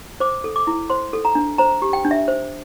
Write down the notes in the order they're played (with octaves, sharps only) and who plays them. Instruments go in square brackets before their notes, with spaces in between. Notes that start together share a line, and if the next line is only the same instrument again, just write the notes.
[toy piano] C5 D6
A4
D6
E4
C5 C6
A4
A#5
D4
C5 A#5
G4
G5
D4
E5
C5